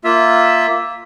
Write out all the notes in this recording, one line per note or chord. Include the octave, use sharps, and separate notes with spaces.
A#3 F4 E5